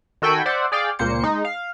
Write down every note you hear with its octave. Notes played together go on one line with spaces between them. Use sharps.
D#3 F#4 A4 G5 G#5 B5
C5 D5 E5 F#5
G#4 D5 F5 G5
C#2 A#2 A#3 C5 C#7
G#3 D#4
F5